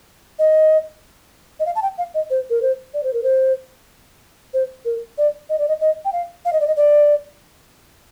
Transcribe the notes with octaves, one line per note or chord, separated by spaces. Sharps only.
D#5
D#5
F5
A5
G5
F5
D#5
C5
A#4
C5
D5
C5
A#4
C5
C5
A#4
D5
D#5
D5
D#5
D#5
G5
F5
F5
D#5
D5
D#5
D5